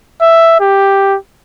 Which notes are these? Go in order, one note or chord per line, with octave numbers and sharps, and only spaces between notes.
E5
G4